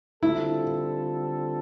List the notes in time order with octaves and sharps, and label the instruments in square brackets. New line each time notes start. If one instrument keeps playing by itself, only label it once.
[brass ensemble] D3 G3 C4 F4 A4 [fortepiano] E4